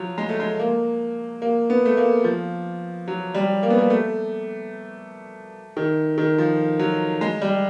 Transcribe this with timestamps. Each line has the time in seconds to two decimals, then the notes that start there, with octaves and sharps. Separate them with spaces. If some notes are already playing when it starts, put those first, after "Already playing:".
Already playing: F3 F#3
0.18 G#3
0.29 A3
0.40 G#3
0.59 A#3
1.42 A#3
1.70 B3
1.85 A3
1.97 A#3
2.24 F3
3.08 F#3
3.35 G3
3.63 A#3
3.70 B3
3.78 A#3
3.90 A3
5.77 D#3
6.18 D#3
6.38 F3
6.79 F#3
7.21 G#3
7.42 G3